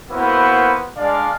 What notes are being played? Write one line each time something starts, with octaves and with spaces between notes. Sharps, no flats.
A#3 B3 E4 F#4 B4 C5
G#3 D4 D5 F5